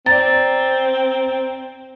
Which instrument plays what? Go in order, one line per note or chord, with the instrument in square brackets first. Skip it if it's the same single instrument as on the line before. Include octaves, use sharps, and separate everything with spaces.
[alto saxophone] C4 [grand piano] D5 A#5 [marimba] A6